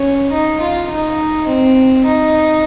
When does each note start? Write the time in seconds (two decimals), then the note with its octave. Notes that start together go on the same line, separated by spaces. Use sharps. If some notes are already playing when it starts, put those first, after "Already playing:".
Already playing: C#4
0.31 D#4
0.60 F4
0.88 D#4
1.47 C4
2.05 D#4